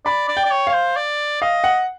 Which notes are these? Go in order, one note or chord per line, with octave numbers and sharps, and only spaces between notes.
D5 B5
D5
G5
D5
C#5
C#5 F5
C5
D5
D#5 F5
F#5